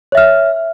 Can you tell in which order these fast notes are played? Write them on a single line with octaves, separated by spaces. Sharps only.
C#5 E5 F6